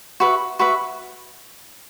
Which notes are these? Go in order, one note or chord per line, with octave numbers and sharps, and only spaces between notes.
F#4 B4 E5
F#4 B4 E5